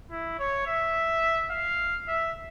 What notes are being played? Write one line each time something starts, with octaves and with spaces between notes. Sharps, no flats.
E4
C#5
E5
F5
E5